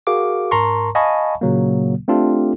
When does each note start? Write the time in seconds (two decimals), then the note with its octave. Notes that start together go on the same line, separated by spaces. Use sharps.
0.07 F#4 G#4 A#4 F5 D6
0.51 G#2 A#4 A5 A#5 C6 C#6
0.95 D#5 F5 G#5 A5 B5 C#6
1.41 A#2 C#3 F#3 A#3
2.08 A3 C4 D4 F4 G4 A4